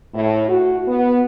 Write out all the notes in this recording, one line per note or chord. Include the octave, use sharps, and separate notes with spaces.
A2
F#4
B3